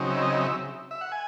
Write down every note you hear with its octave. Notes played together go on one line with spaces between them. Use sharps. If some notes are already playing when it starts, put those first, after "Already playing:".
Already playing: C#3 F#3 C4 D#4
E5
D#5
E5
E5
F#5
G#5